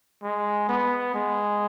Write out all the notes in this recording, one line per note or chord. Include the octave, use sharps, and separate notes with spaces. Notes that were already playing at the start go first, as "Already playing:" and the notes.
G#3
B3
G#3